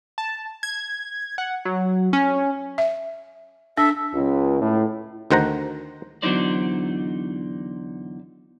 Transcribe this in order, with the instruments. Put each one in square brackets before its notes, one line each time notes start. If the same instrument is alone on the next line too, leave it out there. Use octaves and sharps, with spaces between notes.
[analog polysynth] A5
G#6
F#5
F#3
C#4
[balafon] E5
[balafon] D4 [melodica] A4 E5
[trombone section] C#2
A2
[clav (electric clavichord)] D2 D#3 C5 F#5 A#5
[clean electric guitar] E2 D3 F#3 D#4 C5 D5